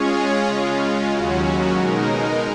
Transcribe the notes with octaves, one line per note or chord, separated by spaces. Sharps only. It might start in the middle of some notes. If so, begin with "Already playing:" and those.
Already playing: G#3 C#4 F4 G#4 C#5
C#3 G#3 C#4 F4
D#2 C#3 F#3 C#4 F#4
B2 G#3 D#4 A#4